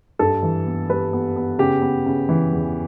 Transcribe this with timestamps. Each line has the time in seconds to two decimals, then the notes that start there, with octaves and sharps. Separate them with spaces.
0.19 G2 A4
0.43 E3
0.66 B3
0.89 G3 B4
1.13 B3
1.36 B3
1.59 C#3 G4
1.82 B3
2.06 C#3
2.29 E3
2.53 E2